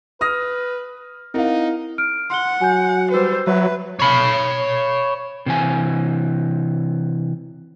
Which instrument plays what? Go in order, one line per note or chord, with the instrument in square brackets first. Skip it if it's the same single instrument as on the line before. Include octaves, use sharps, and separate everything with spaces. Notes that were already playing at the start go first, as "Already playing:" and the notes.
[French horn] B4 [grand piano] D#6 F6 A#6
[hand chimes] C4 E4 [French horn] D#4 [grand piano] A#4 F5
[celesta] F6 D7
[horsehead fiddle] F#5 [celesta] C6 G7
[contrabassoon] F#3 [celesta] G#5 G6
[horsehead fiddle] G3 C5 [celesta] B4 E6
[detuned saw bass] F#3 [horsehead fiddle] B4 [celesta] E5
[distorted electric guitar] C#5 B5
[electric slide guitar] C3 E3 G#5